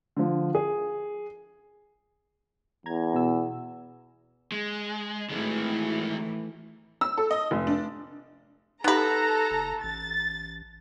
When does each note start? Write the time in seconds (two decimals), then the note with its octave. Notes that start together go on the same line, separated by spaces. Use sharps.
0.16 D3 F3
0.55 G#4
2.86 E2 A#5 G#6
3.14 B2 E6
4.52 G#3
5.30 A2 D#3 E3 G#3 A3
7.01 E6
7.17 A4
7.31 D#5
7.51 F1
7.67 D4
8.84 B3 D#4 G4 A4 B4 A#5
9.51 F#1
9.84 A1 A6